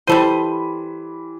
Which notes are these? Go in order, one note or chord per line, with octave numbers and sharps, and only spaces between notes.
E3 G3 A4 C5 B5 D#7